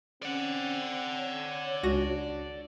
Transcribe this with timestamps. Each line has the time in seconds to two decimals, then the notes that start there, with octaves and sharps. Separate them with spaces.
0.23 C4 C#4 D5 F#5
1.16 C#5
1.83 C#2 D4 F#4 A#6